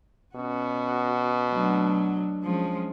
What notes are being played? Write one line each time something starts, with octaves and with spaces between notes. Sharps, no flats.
B2 C#4 F#4
F#3 A3 D4
F3 G#3 C#4